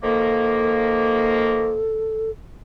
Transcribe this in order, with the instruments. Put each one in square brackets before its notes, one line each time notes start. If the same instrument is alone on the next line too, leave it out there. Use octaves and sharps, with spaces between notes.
[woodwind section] D#3 F3 A#3 [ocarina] A4